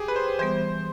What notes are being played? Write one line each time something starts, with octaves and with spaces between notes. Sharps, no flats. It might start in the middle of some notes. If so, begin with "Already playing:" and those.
Already playing: G4 G#4
B4
C5
E3 G3 B3 C5